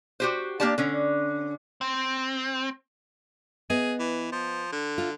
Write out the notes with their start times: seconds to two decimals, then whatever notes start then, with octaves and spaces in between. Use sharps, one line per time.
0.20 F#4 G4 C5
0.60 A#3 C#4 D4 G4 D5 A5
0.78 D3 C#4
1.81 C4
3.70 B3 G#4 D#5
3.99 E3
4.32 F3
4.72 D3
4.98 F4